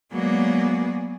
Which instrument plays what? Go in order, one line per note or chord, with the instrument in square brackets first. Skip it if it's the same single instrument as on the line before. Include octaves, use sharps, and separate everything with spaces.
[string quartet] F#3 G#3 A#3 B3 G#4 D5